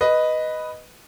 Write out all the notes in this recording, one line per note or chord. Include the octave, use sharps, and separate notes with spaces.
B4 D#5